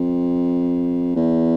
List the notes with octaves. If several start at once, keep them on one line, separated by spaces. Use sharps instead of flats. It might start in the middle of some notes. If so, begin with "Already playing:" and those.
Already playing: F2
E2